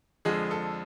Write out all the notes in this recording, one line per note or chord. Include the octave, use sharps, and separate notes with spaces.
F2 D3 F3 G#3 G#4
A4